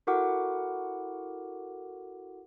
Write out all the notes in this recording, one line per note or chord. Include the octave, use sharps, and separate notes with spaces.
E4 F#4 A4 A#4 F#5 D6